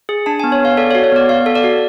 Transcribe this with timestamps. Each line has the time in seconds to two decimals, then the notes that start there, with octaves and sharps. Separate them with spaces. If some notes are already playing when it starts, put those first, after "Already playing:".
0.09 G#4
0.26 D4 A5
0.40 G#5
0.44 B3
0.52 C#5
0.61 B3 F5
0.77 A4 D5
0.91 C#5
0.95 F#4
1.04 C#5
1.12 B3 D5
1.29 B3 F5
1.46 A4
1.55 D5
1.64 F#4